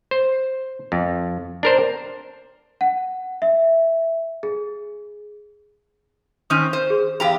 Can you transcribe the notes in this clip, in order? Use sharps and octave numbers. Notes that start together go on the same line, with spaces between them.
C5
F2
D4 A#4 C5
F#5
E5
G#4
D#3 C4 C#4 D#6 G6 D#7
C5
G#4
E2 G4 F5 A#5 F7